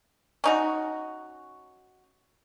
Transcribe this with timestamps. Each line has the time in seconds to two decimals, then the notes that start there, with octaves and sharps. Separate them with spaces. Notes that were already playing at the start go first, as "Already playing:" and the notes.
0.44 C#4 D#4 F#4